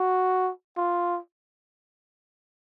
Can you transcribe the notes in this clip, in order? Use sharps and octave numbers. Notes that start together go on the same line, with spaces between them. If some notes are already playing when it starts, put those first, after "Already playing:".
Already playing: F#4
F4